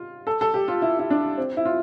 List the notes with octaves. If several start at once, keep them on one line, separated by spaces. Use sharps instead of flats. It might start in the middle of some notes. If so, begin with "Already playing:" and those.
Already playing: F4
A4
A4
G4
F4
E4
E4
D4
C4
E4
F4